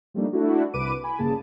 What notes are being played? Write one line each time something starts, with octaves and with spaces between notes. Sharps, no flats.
F3 G3 A3 A#3 D4 D#4
A3 D4 E4 F#4
C2 B4 D6 D7 D#7
G#5 B5
G1 G2 C#3 A#3 G#4 A5